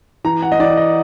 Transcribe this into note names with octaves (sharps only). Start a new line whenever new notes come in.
E3 A#5
F#5
D#5
E3 D5
D#5